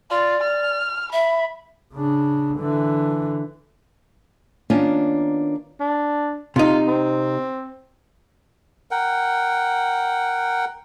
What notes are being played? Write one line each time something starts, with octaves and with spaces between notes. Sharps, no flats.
F4 D5
F6
E5 B5
C#3 D4
D3 E3
D#3 A#3 B3 C#4 D4 F4
D4
C3 D#4 F4
C4
A#4 F#5 G5